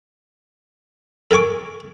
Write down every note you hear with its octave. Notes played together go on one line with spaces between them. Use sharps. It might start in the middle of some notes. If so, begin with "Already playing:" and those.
A4 A#4 G#5 C#6 D6